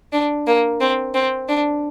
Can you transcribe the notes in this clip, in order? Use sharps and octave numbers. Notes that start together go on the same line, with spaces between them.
D4
A#3
C4
C4
D4